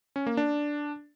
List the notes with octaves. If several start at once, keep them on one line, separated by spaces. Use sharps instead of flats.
C#4
A#3
D4